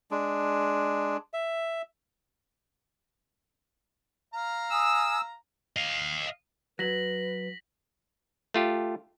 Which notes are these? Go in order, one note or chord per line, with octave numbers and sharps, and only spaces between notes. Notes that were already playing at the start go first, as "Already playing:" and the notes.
G#3 D4
E5
F5 A#5
G#5 D#6 E6
D#5 F5
F#3 B4 A#6 B6 F#7
A3 F4 G4